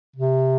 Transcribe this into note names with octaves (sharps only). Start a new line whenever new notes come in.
C3